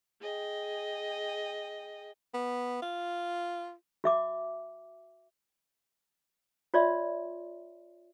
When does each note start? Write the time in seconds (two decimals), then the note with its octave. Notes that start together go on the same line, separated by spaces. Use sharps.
0.20 G#4 D#5 G5
2.34 B3
2.82 F4
4.04 F#4 E5 D6
6.74 F4 C#5 D5 E5 C6